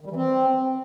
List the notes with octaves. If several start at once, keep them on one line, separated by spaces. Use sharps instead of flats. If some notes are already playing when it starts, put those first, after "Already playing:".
D#3
G3
E3
C4